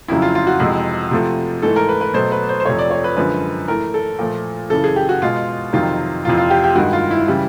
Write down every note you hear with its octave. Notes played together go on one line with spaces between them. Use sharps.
F2 C#3 F#3 E4
F4
F4
F#4
F2 C3 E3 G#3
C3 F3 A3
G#2 E3 A3 A4
A#4
B4
B4
B2 F#3 A3 C5
B4
C5
C5
F2 C3 F3 A3 C#5
D5
C#5
B4
F#2 D3 F3 G#3 B4
A2 E3 A3 A#4
A4
A#2 F3 A3
F#2 C#3 E3 A4
G#4
G4
F#4
B2 G#3 F4
F2 C3 D#3 F#3 F4
F2 C3 E3 F4
F4
G4
G4
G2 D#3 G#3 F#4
F4
E4
C#3 E3 G3